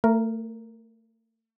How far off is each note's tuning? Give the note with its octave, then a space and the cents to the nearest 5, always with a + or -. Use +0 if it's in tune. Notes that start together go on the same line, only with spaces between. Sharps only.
A3 +35 A#4 +0